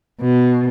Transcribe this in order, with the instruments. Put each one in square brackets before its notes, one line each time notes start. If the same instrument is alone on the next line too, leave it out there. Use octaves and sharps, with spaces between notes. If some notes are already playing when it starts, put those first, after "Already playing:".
[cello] B2